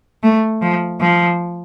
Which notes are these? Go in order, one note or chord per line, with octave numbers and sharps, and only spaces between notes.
A3
F3
F3